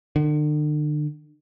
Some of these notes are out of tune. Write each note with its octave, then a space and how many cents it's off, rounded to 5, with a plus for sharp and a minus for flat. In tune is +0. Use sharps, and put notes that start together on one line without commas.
D3 +40